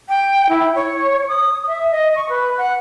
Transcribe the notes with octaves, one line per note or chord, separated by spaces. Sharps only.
G5
E4
C#5
D#6
E5
D#5
C#6
B4
F#5